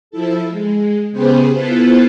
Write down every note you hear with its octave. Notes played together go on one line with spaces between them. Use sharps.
F3 E4 A4
G#3
C#3 B3 G4 G#4 B4 C5
B3 E4 F4 A4 B4 C5